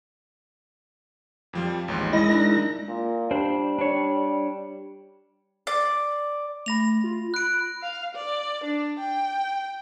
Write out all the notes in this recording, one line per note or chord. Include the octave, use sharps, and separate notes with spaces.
F2 F3 G3
A1 D#2 G#2
G#3 E4 G#4 D#5 A#6
D4 D#4 A#4
A#2
G3 D4 C5
D4 C#5
D5
A3 B5 A#6 F7
F4
B5 F#6 D7
F5
D5
D4
G5